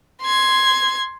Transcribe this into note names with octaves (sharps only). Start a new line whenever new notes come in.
C6 G#6